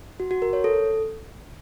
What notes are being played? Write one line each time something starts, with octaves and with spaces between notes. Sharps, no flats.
F#4
F#4
A#4
C#5
A4